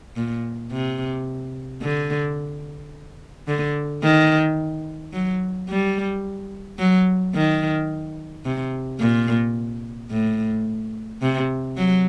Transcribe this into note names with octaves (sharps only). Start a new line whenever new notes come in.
A#2
C3
D3
D3
D#3
F#3
G3
F#3
D#3
C3
A#2
A2
C3
F#3